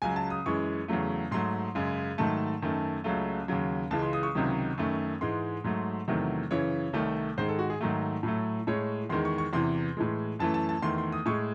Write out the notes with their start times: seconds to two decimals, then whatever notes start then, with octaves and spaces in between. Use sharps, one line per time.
0.02 C#2 C#3 F#3 G#5
0.16 A5
0.30 D#6
0.46 F#2 E3 G#3 C#6
0.88 E2 C#3 F#3 A3
1.31 G#2 F#3 A3 C6
1.75 F#2 C#3 G#3
2.18 G#2 D#3 F#3 A3 A5
2.62 F#2 D#3 A3
3.04 C#2 C#3 F#3 A3
3.48 D#2 C#3 F#3
3.91 C#2 C#3 E3 G#3 A5
4.02 C6
4.13 D#6
4.23 C#6
4.35 C#2 C3 D#3 F#3
4.78 F#2 D#3 A3
5.21 G#2 E3 G#3 C6
5.64 G#2 F#3 A3
6.08 E2 C3 D#3 F#3 A3
6.51 F#2 C#3 E3 C#5
6.93 C2 C3 D#3 A3
7.37 G#2 D#3 G#3 C5
7.48 A4
7.59 F#4
7.70 G#4
7.81 G#2 D#3 F#3 A3
8.23 A2 F#3 A3
8.67 A2 G#3 C#5
9.09 E2 D#3 G#3 C6
9.25 C#6
9.38 C#6
9.53 E2 C3 E3 C6
9.97 A2 E3 G#3
10.39 F#2 E3 A3 A5
10.54 A5
10.69 A5
10.82 E2 D#3 A3 C6
10.98 C6
11.12 D#6
11.26 A2 G#3 C#6